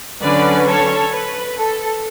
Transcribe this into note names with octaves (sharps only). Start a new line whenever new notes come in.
D3 F#3 C#4 B4 D5
A4 C#5
B4
A4